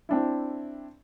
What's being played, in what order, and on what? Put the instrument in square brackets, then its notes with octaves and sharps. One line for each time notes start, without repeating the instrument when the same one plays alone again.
[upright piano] C4 D4 E4